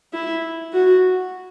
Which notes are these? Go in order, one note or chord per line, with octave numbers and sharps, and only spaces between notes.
E4
F#4